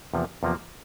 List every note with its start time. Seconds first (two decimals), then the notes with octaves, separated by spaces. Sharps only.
0.14 E2 C3 F3 A#3
0.43 E2 C3 F3 A#3